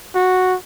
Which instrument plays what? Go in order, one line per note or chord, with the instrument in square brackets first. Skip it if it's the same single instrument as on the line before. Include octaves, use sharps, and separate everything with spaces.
[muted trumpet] F#4